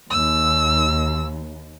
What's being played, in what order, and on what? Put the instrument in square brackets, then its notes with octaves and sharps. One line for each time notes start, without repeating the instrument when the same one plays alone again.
[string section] D#2 [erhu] E6